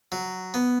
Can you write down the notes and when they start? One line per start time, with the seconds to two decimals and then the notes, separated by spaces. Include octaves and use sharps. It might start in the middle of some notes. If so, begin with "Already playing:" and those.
0.12 F#3
0.54 B3